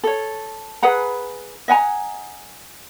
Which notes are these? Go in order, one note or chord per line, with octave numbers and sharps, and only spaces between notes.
A4 C#5
G#4 B4 F#5 A#5
D#5 F#5 G#5 A#5